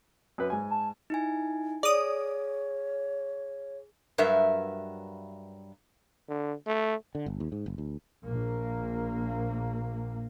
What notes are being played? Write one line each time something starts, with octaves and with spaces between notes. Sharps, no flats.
F#2 B4
G#2 G#5
A5
D#4 E4 G#5
G#4 C#5 D5 D#6
G2 F#3 A#4 B4 E5
D3
A3
D3
G1
D#2
G#2
F#1
D2
A#1 A#3